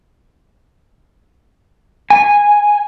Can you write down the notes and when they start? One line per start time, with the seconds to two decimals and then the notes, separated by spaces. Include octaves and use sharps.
2.10 G#5